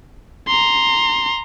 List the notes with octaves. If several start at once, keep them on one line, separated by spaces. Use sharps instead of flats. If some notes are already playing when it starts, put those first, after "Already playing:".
A#5 C6